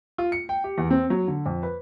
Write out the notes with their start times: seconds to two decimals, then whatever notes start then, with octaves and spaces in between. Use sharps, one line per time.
0.18 F4
0.32 C#7
0.49 G5
0.64 G4
0.78 E2
0.91 C4
1.10 F#3
1.28 D3
1.46 F2
1.63 B4